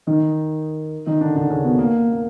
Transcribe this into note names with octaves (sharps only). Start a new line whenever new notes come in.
D#3 D#4
D#3 D#4
D3 D4
D3 D4
C#3 C#4
B2 B3
A#3
A#3